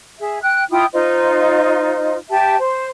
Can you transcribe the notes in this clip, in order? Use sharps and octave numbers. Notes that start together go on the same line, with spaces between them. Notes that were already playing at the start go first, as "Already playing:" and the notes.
G#4 E5
G5 F#6
E4 F4 G5 D#6
D#4 F4 C5 D#5
G4 E5 G5 A5
C5